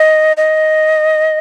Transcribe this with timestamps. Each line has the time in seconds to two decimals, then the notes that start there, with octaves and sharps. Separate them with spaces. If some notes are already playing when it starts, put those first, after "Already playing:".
Already playing: D#5
0.37 D#5